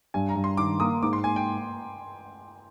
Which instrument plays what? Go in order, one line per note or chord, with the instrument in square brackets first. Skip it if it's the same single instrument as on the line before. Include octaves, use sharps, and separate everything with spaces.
[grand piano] G2 [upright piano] G#5
[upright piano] A#5
[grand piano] G2
[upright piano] C6
[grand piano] D#3 [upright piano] D6
[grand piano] A#3 [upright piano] D#6
[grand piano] G#2 [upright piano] D6
[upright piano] C6
[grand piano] A#3 [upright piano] G#5
[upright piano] G5